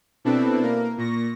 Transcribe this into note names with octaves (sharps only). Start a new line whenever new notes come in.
B2 C4 D4 E4 A4 B4
A#3 A#4
A#2 C#6 A#6